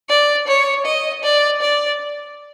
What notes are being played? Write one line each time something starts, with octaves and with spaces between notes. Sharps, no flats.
D5
C#5
D#5
D5
D5